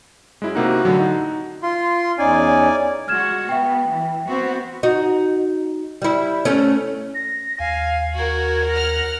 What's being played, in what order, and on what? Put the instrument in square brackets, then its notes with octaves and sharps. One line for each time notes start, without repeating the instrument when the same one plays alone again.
[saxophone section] F#2 [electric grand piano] G#3 E4
[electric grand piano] C3 A#3 D#4 [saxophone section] F#4
[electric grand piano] A2 D3 F#3
D#4
[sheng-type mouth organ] F4 C6
[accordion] E2 C#4 D#4 [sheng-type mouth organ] D5 G#5
[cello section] G#3 F#4 [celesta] F6 G#6 E7
[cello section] B3 [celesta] E5 G5
[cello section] E3
B3 C4 F#4
[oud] D#4 F#4
G3 E4
A3 C#4
[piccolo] A#6
[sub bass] D#2 [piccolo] F5 [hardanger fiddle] G#5
[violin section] F#4 [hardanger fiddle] A#4 [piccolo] G#6
[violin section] F#5 F6 [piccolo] A#6